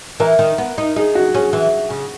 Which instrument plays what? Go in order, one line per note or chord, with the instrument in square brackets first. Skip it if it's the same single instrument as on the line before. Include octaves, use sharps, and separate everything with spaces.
[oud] E3 [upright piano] A#4
[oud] D#3
B3
D#4
[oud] D#4 [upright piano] G#4
[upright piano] F#4
[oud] C#4 [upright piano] G#4
[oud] E3
C#3